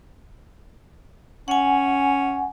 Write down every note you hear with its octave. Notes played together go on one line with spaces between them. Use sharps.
C#4 F#5 G#5